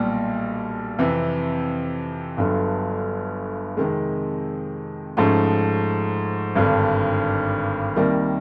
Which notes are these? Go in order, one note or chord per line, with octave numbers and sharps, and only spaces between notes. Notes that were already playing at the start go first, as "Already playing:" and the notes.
Already playing: B1 A#2 G3
F2 C3 E3
G1 G2 D3 F#3
F2 C3 D#3 G#3
G#2 F3 A3 C#4
G#1 G2 D3
C2 C3 D#3 G3 A#3